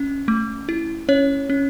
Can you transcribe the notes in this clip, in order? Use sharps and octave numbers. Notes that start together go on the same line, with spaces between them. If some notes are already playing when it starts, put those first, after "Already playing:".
Already playing: C#4
A3
E4
C#4 C#5
C#4